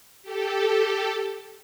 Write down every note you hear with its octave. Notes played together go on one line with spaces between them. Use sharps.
G4 A4